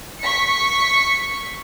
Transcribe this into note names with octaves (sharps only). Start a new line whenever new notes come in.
C#6 B6 C#7